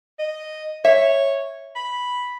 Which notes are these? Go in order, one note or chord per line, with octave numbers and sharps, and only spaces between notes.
D#5
C#5 E5
B5